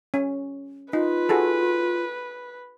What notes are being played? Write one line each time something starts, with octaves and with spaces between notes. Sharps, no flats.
C#4
D#4 F4 B4
F#4 G#4 A4